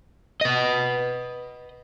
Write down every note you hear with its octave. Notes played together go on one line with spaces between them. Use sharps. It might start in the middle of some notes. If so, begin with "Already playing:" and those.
B4 D#5